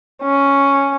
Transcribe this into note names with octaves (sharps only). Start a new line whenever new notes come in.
C#4